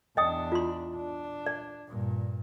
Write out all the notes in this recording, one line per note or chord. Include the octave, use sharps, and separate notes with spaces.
E2 D4 D#5 G5 D#6
F4 C6
D4
D5
G2 A#2